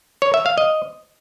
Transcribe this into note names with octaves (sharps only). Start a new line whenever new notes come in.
C#5
E5
F5
D#5